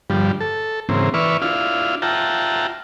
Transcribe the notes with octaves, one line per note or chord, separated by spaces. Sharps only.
G2 D3 F3 G3
A4
G#2 C#3 E3 A#3 C4
E3 B4 D5 E5 C#6 F6
D4 E4 F4 F5
F4 E5 F#5 G5 A5 A#5